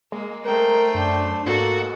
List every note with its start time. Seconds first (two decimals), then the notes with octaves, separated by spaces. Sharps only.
0.12 G#3 A#3
0.45 A3 A#4 C5 G5
0.95 F#2 D4
1.46 G#2 A#3 F#4 A4